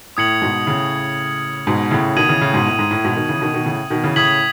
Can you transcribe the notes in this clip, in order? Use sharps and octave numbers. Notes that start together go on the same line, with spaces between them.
A2 D#6 G#6 C#7 F#7
G#2 B2
A2 C#3
G#2 B2
A2 C#3
B2 D#3 D#6 G#6 D#7 F#7
C#3 E3
A2 C#3
G#2 B2
A2
G#2
A2
G#2 B2
B2 D#3
C#3 E3
B2 D#3
B2 D#3
A2 C#3
B2 D#3
C#3 E3
A2 C#3 D#6 G#6 B6 F#7